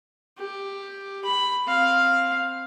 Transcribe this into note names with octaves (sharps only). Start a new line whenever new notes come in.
G4
B5
C4 F5